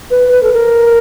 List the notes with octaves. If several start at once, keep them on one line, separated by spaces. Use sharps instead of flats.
B4
B4
A4
A#4